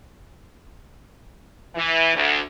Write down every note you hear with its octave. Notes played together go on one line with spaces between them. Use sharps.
E3
D2